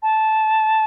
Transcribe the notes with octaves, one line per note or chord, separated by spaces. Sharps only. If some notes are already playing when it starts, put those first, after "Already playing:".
A5